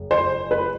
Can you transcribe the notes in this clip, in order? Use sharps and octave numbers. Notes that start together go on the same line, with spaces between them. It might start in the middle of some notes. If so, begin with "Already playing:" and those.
Already playing: F#1
C5
B4